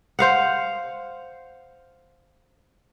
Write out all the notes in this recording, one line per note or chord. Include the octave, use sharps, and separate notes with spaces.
C5 F5 F#5